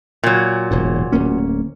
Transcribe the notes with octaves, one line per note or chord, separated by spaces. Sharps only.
A#2 F#3
E1 G#2
D1 A#3 C#4